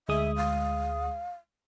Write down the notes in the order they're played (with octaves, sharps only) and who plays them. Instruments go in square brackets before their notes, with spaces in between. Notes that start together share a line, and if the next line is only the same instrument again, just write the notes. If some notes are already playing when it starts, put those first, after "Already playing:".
[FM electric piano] D2 G#3 D#6 [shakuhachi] E5
[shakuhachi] F5